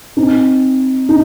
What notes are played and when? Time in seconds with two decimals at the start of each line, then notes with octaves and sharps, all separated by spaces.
0.17 C4 D#4
1.09 D#4